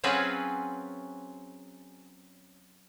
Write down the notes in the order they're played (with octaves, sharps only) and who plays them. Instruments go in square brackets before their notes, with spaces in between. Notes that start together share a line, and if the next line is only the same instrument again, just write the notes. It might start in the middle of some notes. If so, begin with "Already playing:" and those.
[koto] F#3 C4 C#4 F4 G#4 B4